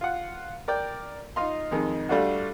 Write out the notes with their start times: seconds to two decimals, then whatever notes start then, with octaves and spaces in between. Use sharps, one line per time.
0.01 F4 F#5
0.68 A#4 D5 G5
1.36 D#4 F4 D#5 F5 C6
1.71 F2 D#3 G#3 D#4
2.09 G3 A3 D4 F4 F#4